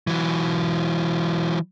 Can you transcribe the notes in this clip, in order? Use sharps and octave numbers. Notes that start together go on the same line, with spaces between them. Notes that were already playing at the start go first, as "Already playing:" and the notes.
E3 F#3